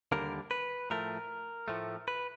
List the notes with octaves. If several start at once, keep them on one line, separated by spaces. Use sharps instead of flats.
D#2 D3 G3 A#3 A#4
B4
A2 F3 A3 A#4
A2 F3 A3
B4